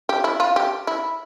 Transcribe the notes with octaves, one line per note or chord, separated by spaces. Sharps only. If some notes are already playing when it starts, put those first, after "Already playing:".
G4
E4
F4
G4
E4